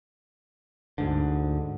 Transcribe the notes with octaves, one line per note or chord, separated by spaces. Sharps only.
D2 G#2 D3